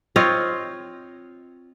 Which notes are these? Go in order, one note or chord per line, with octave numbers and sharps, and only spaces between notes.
C4 F4 C#5 D#5